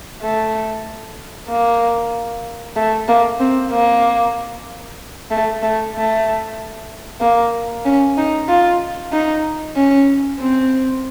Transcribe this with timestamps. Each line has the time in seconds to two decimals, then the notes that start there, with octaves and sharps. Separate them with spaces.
0.22 A3
1.49 A#3
2.76 A3
3.08 A#3
3.40 C4
3.71 A#3
5.31 A3
5.63 A3
5.95 A3
7.21 A#3
7.85 C#4
8.18 D#4
8.48 F4
9.13 D#4
9.76 C#4
10.40 C4